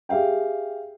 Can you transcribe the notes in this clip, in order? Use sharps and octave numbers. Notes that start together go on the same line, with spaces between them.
G4 G#4 E5 F5 G5